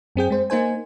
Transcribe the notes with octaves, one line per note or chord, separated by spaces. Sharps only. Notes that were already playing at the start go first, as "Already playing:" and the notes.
F#2 C4 G#4 G5
G#3 C5
A#3 D#4 C5 G#5